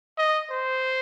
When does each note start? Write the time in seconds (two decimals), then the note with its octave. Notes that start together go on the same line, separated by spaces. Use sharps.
0.18 D#5
0.51 C5